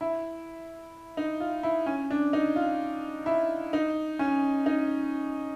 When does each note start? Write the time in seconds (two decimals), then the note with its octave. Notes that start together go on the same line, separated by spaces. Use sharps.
0.01 E4
1.17 D#4
1.40 F4
1.63 E4
1.86 C#4
2.11 D4
2.33 D#4
2.56 F4
3.26 E4
3.73 D#4
4.19 C#4
4.66 D#4